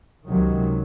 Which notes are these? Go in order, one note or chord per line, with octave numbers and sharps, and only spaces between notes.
C#2 C3 D#3 F#3